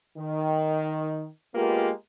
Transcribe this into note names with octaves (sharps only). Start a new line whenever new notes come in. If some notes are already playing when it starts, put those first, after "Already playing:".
D#3
G#3 A#3 B3 F4 G4 A#4